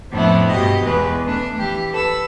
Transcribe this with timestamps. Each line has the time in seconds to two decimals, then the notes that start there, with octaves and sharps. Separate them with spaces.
0.11 F2 A2 B3 C4 D4 E4
0.49 G2 B2 G4 D#5
0.80 E2 G#3 B4
1.26 A3 D4
1.57 E3 G4
1.93 A4 B4 E6